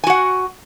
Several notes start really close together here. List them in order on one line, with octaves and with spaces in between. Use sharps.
G#5 F#4 F#5